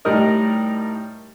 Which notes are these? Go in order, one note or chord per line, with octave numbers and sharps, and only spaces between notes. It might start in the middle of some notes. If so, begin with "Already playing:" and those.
A2 G3 D#4 A#4 D#5